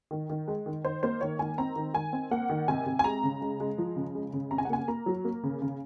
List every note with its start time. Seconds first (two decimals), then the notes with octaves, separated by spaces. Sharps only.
0.11 D#3
0.30 D#3
0.48 G#3
0.66 D#3
0.84 D#3 C5
1.03 A#3 C5
1.21 D#3 C#5
1.39 D#3 G#5
1.58 C4 A#5
1.76 D#3
1.94 D#3 G#5
2.13 C4
2.31 A#3 F#5
2.50 D#3
2.68 C3 G#5
2.86 C3
2.99 G#5
3.04 G#3 A#5
3.23 C#3
3.42 G#3
3.60 G#3
3.78 F3
3.96 C#3
4.15 G#3
4.33 C#3
4.51 C3 A#5
4.58 G#5
4.65 F#5
4.70 A#3 G#5
4.88 A#3 A#5
5.06 F#3
5.25 A#3
5.43 C#3
5.62 C#3